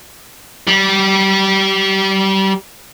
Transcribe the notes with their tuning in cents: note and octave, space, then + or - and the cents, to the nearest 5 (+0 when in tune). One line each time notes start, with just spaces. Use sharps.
G3 -25